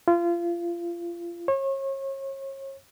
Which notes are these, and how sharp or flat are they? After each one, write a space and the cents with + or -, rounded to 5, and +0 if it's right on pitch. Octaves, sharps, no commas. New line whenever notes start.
F4 -30
C#5 -35